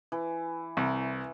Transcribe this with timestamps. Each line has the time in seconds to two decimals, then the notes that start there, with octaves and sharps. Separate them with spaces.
0.12 E3
0.77 C2